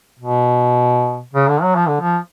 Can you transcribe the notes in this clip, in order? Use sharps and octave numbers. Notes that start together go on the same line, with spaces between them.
B2
C#3
D3
F#3
F3
D3
F3